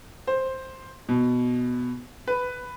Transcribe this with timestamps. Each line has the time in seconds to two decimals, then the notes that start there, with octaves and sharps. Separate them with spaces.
0.27 C5
1.09 B2
2.28 B4